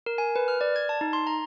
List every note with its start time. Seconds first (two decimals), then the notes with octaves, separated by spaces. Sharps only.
0.06 A#4
0.18 G#5
0.36 B4
0.48 F6
0.61 D5
0.76 G#6
0.89 A5
1.01 D#4
1.13 C6
1.27 A#5